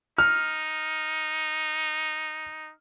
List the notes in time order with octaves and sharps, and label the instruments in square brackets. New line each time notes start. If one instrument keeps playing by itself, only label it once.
[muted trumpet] D#4 [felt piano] F6